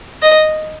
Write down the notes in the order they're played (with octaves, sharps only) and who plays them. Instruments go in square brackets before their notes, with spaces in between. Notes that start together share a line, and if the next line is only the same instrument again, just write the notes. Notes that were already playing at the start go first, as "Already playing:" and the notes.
[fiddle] D#5